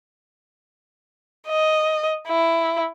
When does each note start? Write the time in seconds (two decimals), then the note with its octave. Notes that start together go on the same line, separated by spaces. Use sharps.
1.48 D#5
2.28 E4